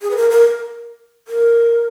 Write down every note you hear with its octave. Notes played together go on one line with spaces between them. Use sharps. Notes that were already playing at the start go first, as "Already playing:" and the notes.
G#4
B4
A#4
A#4
A#4